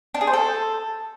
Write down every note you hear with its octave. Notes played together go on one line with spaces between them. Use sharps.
D4
G#4
C5
A4